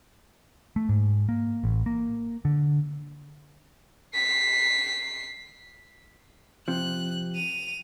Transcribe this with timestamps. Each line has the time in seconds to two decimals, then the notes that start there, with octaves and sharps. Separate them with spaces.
0.76 A3
0.89 G#2
1.29 A#3
1.64 A1
1.86 A#3
2.45 D3
4.14 B6 C7
6.68 C3 F3 F#6
7.35 D#7 F7